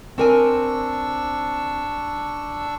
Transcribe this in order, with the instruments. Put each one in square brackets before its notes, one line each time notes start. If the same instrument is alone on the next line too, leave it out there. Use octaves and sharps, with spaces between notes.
[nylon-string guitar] C4 A#4 G#5 [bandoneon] D4 C#6 E6